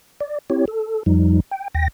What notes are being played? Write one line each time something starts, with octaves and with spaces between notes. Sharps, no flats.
D5
C4 E4 G4 C#5
A4
F2 F3 G3 D#4
G5
D#2 G5 A#6